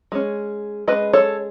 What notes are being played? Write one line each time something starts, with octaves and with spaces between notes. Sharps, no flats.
G#3 C#4
G#3 C#4 B4 D#5
A4 C#5